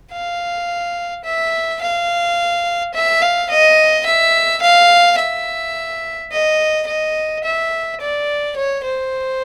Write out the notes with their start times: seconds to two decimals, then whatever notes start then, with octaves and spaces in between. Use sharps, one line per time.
0.12 F5
1.25 E5
1.82 F5
2.94 E5
3.22 F5
3.50 D#5
4.06 E5
4.62 F5
5.18 E5
6.32 D#5
6.87 D#5
7.44 E5
8.01 D5
8.56 C#5
8.84 C5